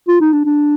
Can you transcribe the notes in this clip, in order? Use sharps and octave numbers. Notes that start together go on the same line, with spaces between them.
F4
D#4
D4
D4